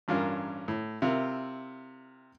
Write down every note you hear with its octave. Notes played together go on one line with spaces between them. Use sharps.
A1 G2 C#4 F4 A#4
A2
C3 E4 F4 A#4